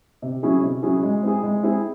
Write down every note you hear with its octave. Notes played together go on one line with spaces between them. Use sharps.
C3
F#3 C#4 E4 G#4
C3
F#3 C#4 E4 G#4
G#3
C4 E4 G#4
G#3
C4 E4 G#4